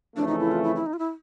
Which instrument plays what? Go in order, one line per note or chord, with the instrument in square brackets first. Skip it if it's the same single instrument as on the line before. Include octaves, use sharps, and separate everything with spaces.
[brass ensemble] F2 C#3 E3 A3 [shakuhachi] D4
[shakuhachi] D#4
E4
F4
E4
E4
D#4
F4
E4